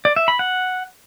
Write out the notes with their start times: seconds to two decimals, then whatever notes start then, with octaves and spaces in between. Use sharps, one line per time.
0.05 D5
0.16 E5
0.28 B5
0.39 F#5